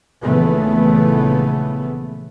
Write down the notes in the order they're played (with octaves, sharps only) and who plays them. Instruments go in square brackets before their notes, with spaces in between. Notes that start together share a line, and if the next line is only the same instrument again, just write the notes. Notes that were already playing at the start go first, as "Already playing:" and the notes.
[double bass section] A#1 C#3 E3 A3 B3